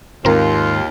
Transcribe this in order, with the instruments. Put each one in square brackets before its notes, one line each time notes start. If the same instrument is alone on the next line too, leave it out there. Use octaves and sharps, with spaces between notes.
[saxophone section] D#2 [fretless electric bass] G#2 D#3 G#3 [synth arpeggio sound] C4 A#4 [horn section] F4